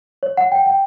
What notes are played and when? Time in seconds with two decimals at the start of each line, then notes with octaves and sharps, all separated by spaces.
0.23 C#5
0.37 F#5
0.52 G5
0.66 G5